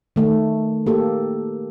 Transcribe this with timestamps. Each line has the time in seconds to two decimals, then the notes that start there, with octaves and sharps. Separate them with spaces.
0.16 D#3 A3
0.86 A#3 G4 A4